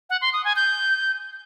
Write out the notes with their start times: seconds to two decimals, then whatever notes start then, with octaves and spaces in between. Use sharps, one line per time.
0.10 F#5
0.21 C6
0.33 D#6
0.44 G#5
0.56 G6